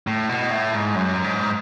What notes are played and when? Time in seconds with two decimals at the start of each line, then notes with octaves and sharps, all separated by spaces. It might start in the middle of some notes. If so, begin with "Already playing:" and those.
0.07 A2
0.29 B2
0.51 A2
0.73 G#2
0.95 F#2
1.24 G#2